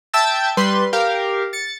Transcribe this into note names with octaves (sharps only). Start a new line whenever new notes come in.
E5 G5 A5 E6 G6 A6
G3 B4 C6
G4 A#4 F5
A6 C#7